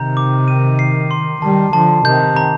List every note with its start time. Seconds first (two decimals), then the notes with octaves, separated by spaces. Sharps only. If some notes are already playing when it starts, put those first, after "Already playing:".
Already playing: C3 D#3 A#5 G6
0.17 D6
0.48 D#7
0.79 C7
1.11 C6
1.42 D#3 G3 A5
1.73 D3 F3 A5
2.05 C3 D#3 G6
2.36 A#5